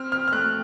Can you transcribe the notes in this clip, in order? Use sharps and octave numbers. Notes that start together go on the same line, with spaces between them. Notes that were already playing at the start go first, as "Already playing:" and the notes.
Already playing: C4 F6
F6
F6
A3 F#6